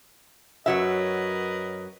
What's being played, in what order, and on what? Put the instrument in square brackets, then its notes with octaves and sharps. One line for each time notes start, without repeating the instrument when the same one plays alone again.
[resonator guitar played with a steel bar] F#2 F#3 E5 [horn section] A#4 B4 D#5